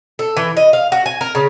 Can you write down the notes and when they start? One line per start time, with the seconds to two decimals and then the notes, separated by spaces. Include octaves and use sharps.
0.19 A4
0.37 E3
0.57 D#5
0.73 F5
0.92 F#4
1.06 G#5
1.21 A#4
1.35 C#3